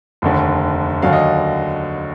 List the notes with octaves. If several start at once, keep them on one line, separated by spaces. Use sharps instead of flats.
F1 D#2 D3
D#2 D3 F#3 F5
D#5